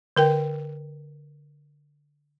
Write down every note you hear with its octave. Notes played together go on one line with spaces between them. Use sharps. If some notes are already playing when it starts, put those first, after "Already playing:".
D3 A#4 G5